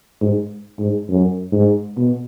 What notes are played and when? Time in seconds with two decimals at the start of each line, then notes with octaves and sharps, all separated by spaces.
0.21 G#2
0.79 G#2
1.09 F#2
1.52 G#2
1.97 B2